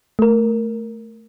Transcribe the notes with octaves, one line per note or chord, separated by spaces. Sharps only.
A3 A#4